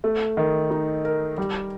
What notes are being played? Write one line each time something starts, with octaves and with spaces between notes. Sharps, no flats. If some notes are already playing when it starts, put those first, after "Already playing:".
A3
D#3
D#4
A#4
G3